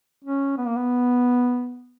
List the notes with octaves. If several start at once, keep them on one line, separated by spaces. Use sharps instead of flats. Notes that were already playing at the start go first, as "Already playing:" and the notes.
C#4
B3
A#3
B3